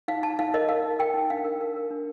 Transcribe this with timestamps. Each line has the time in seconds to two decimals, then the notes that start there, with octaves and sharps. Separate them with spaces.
0.08 D#4 F5
0.23 D#4 A5
0.39 D#4 F5
0.54 A#4 D#5
0.69 A#4 F5
0.84 D#4
0.99 A#4 G5
1.14 D#4
1.30 D4 F5
1.45 A#4
1.61 A#4
1.76 A#4
1.90 D4